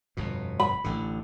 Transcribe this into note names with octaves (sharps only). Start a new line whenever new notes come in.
G1 F2 B2
B5
A1 A2 D3